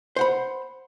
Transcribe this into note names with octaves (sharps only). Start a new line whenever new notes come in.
C5 F#5 B5